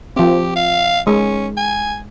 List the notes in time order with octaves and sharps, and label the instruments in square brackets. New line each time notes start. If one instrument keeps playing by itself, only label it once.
[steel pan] F3 C4 [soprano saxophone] G4
[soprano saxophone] F5
[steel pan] G#3 [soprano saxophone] C#4
[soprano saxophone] G#5